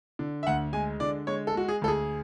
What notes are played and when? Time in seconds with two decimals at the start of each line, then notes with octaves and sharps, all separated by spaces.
0.19 D3
0.43 E5
0.47 D2 F#5
0.73 G#3 G#5
1.00 D3 D5
1.27 G#3 C#5
1.47 A4
1.54 G#3 F#4
1.69 G#4
1.82 D2 A4
1.88 G#4